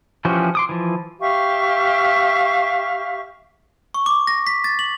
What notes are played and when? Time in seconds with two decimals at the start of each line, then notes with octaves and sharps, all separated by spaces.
0.25 E3 F3 C#4 F#4 G4
0.55 C6 D6 D#6
0.69 E3 F3
1.20 G4 E5 F5 C#6
3.94 C#6
4.06 D6
4.27 A#6
4.47 B6
4.64 A6
4.79 F#7